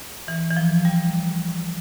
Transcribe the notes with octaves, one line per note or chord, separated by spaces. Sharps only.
E3
E3
F3
G3